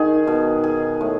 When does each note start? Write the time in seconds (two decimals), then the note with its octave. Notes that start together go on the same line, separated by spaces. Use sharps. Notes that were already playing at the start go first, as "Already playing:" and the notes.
Already playing: D#3 D#4 G#4
0.27 B2
0.64 G#4
1.01 A2